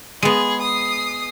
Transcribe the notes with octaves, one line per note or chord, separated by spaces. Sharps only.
G#3 B3 G#4
D#6 C7